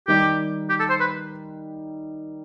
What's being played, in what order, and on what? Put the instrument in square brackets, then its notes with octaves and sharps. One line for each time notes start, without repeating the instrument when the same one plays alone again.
[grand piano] D#3 G3 D#4 [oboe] G4
[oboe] G4
A4
C5
B4